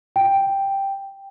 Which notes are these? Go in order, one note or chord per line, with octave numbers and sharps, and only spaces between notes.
G5